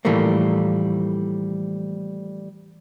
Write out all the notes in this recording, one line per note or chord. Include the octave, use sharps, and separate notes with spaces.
A2 E3 F3 G3 A3 A#3